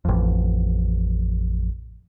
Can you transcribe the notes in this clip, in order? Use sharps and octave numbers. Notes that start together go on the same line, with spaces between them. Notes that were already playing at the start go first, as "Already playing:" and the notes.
A1 F2